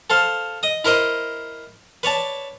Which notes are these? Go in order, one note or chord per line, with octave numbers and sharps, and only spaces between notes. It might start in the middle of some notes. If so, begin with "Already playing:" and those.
A4 C5 F5
D#5 D#6
E4 A#4 C5 D#5
B4 C#5 D5 A5